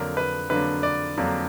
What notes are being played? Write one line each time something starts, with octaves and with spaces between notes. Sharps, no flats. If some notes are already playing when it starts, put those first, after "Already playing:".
Already playing: F2 D3 F#3 A#3 D4 A#4
B4
F2 D3 F#3 A#3 D4 B4
D5
F2 D3 F#3 A#3 D4